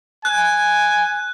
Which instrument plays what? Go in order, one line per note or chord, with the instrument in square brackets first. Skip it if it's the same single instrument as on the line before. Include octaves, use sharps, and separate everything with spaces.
[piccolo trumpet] G#5 [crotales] F#6